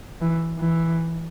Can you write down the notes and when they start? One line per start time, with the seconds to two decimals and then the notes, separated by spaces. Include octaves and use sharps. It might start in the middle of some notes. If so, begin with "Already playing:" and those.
0.21 E3
0.58 E3